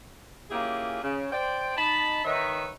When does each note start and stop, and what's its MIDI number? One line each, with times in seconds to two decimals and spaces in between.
0.51 1.02 58
0.51 1.02 61
0.51 1.02 64
0.51 1.02 65
0.51 1.02 67
0.51 1.02 68
1.03 1.28 49
1.32 1.73 72
1.32 1.73 74
1.32 1.73 79
1.77 2.24 63
1.77 2.24 81
1.77 2.24 83
2.25 2.70 51
2.25 2.70 63
2.25 2.70 71
2.25 2.70 73
2.25 2.70 76